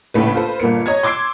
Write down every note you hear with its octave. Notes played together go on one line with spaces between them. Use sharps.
A#1 A2 C#3 A3 B4
F4 A4 B4 C5
G1 A#2 A#3 C#7
C#5 D#5 A#5 G#6
C6 D6 E6 G#6 C7 D7